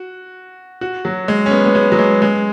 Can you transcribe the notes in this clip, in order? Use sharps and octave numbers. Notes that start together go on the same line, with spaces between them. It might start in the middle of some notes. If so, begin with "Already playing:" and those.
Already playing: F#4
F#4
F#3
G#3
C#4
B3
B3
G#3
F#3
G#3
G#3